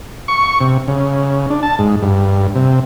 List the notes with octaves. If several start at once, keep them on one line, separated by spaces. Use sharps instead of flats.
C#6
C3
C#3
D4
A5
G#2
G2
C3